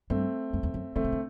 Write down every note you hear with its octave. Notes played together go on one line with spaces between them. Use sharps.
G2 A3 C4
F#2
E2
F#2
D3 A3 C4
C3
D3